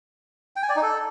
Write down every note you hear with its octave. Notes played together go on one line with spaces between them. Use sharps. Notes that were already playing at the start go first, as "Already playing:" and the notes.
G5
G#5
D5
D#4
A4